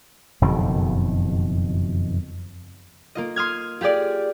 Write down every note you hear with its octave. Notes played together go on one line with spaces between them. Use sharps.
F#1 F2 B2 D#3
A#3 F4 D#5
C6 D#6 F6 G#6
F4 G4 G#4 D5